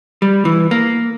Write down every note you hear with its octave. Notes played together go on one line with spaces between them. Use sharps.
G3
E3
A#3